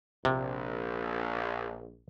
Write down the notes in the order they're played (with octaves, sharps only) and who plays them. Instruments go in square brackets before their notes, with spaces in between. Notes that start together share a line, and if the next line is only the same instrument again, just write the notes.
[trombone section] A#1 [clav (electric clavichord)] C3